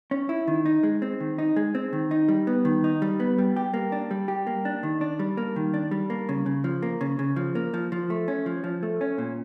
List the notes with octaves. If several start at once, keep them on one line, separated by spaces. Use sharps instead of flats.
C#4
E4
D#3
D#4
G#3
C4
D#3
D#4
G#3
C4
D#3
D#4
G3
B3
D#3
D#4
G3
B3
G3
G4
A#3
D4
G3
G4
A#3
D4
D#3
D4
G3
A#3
D#3
D4
G3
A#3
C#3
C#3
F3
A#3
C#3
C#3
F3
A#3
F3
F3
A3
C#4
F3
F3
A3
C#4
A#2